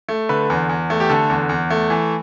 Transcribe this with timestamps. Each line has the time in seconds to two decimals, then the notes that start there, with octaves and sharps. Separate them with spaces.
0.09 A3
0.29 D3 B4
0.50 E2
0.69 E2
0.90 A3
1.00 G4
1.09 D3 A4
1.30 E2
1.49 E2
1.70 A3
1.90 E3